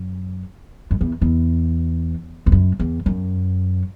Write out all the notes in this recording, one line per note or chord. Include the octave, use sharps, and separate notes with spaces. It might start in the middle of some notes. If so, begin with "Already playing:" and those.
Already playing: F#2
F#2
E2
E2
E2
F#2
E2
F#2